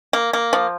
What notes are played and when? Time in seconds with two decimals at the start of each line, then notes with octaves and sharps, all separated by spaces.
0.13 A#3
0.33 A#3
0.53 F3